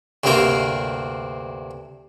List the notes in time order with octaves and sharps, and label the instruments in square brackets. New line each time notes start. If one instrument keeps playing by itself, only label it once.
[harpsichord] D2 G2 C3 A#3 C4 A#4